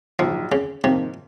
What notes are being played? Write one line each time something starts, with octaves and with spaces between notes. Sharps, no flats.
A#1 G#2 F3 F#3
C#3
G#2 C3 F3 A#3